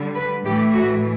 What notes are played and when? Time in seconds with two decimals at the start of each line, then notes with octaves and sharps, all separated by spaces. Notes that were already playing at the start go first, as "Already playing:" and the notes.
Already playing: D3 G3
0.15 B4
0.44 A2 E3 A3 G4
0.73 F#4